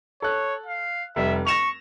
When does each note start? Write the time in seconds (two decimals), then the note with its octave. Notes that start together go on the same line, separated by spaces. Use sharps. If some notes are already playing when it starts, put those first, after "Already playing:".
0.22 A4 C#5 F#6
0.66 F5
1.16 F1 G3 E5
1.47 C#6 A#6 E7 F7